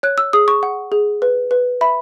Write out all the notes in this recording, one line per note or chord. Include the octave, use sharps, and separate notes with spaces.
C#5 F#6
E6
G#4 D#6
C#6
F#5
G#4
B4
B4
E5 B5